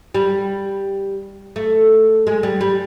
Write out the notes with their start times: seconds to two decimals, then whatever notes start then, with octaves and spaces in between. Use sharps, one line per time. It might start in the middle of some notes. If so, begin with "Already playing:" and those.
0.14 G3
1.56 A3
2.27 G#3
2.43 G3
2.61 G3